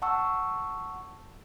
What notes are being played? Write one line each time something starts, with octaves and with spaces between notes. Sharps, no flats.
F#5 A5 C#6 E6